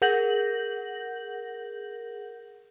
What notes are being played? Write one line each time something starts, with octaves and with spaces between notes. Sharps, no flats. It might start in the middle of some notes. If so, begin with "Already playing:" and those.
G#4 A#4 F#5 G6 A#6 F#7